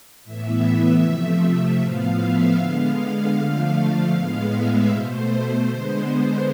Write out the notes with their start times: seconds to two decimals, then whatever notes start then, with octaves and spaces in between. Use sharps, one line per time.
0.24 A2 E3 B3 E5
1.02 C3 F3 A3
1.41 E5
1.79 A2 F3 B3 F5
2.18 E5
2.56 D3 G#3 B3 F5
2.95 F5
3.34 D3 F3 A3 F5
3.73 F5
4.11 A2 G#3 B3
4.50 E5
4.88 B2 A3 C5
5.66 D3 G#3 B3